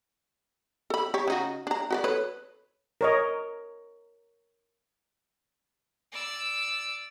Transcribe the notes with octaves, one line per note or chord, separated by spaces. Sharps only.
A4 B5
G4 C#5
C#3 D#4 F#4
D4 A#5
F#4 B4 D5
A4 B4 C#5
A#4 C#5 D#5
D5 E6